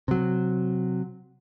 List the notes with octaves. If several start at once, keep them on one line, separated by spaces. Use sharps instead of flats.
C3 F#3